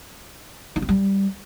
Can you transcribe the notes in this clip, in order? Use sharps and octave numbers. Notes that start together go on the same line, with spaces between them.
D#4
C4
G3